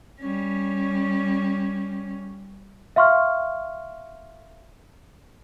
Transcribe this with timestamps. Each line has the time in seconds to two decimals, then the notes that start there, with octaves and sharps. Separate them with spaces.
0.21 G3 C#4
2.96 E5 F5 C6 C#6 F6